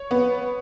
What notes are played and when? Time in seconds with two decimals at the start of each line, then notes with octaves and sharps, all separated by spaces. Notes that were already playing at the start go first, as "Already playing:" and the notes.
Already playing: C#5
0.11 B3